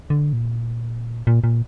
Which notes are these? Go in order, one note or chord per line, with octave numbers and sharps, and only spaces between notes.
D3
A#2
A#2
A#2